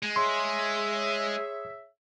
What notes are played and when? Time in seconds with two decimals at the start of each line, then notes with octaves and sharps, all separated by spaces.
0.03 G#3
0.16 G#4 C#5 E5 C6